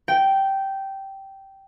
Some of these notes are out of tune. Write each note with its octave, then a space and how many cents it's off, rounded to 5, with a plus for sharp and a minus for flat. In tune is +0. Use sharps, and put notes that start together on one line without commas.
G5 -10